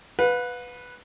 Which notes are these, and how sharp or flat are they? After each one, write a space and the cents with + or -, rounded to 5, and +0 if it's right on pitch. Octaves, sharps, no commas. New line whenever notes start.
B4 +0 F5 +45